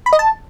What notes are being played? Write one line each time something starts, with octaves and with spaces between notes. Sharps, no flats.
B5
D#5
A5